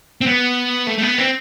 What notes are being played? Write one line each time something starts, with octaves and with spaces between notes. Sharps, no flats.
C4
B3
A3
A3
B3
C4